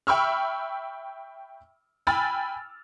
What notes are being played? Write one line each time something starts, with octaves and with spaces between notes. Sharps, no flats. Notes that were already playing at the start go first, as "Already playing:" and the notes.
E5 G5 B5 C#6 E6 F6
G5 G#5 B5 E6 F6 A6